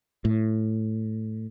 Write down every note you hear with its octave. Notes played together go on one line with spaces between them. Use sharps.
A2